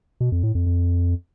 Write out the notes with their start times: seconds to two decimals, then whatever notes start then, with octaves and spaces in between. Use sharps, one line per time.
0.20 B2
0.32 F2
0.43 A2
0.55 F2
0.66 F2